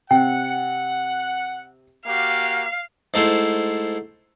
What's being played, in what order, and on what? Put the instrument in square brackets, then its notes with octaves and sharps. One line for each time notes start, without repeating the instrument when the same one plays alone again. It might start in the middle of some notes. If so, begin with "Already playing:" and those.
[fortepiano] C3 [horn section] F#5 [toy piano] G5
[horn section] A#3 F#4 G4 [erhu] F5
[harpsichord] G#2 A3 E4 C5